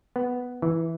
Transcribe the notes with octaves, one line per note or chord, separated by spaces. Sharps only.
B3
E3